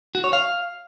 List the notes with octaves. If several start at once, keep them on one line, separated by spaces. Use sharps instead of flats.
F#4
C#5
F5